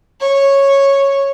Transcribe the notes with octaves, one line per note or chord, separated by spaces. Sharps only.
C#5